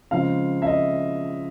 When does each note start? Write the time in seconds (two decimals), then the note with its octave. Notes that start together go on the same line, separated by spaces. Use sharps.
0.11 C#3 F3 G#3 C4 F5
0.62 E5
0.67 D#5